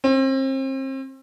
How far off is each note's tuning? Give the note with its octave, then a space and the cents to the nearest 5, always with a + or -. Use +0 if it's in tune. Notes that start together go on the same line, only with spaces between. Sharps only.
C4 +35